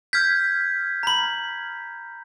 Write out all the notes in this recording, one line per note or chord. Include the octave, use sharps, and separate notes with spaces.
F6 G6 G#6 B6
A#5 B5